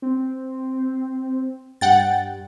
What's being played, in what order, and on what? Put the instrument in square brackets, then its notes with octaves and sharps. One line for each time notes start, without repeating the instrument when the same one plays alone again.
[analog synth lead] C4
[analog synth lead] G2 [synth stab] F#5 G5 A6